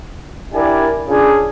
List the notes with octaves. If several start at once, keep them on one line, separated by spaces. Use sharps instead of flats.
D4 E4 G4 A#4 D5 G#5
C#3 D4 F4 G#4